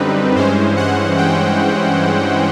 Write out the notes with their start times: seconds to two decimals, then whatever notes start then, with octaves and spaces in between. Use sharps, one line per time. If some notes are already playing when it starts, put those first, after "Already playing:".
Already playing: F#2 D3 G3 C4 D#4 B4
0.35 G2 E3 G#3 C#4 C5
0.76 F#5
1.17 G5